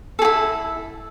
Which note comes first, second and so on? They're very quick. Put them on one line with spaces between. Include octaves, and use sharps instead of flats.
A4 G#4 E4